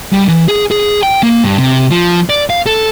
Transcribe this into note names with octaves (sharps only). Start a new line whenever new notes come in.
G3
E3
G#4
G#4
G5
A#3
G2
C3
F3
D5
F5
A4